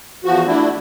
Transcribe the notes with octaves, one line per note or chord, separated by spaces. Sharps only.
E2 F3 F#4
A3 D4 E4